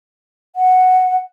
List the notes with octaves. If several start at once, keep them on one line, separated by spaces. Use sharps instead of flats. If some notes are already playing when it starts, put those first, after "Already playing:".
F#5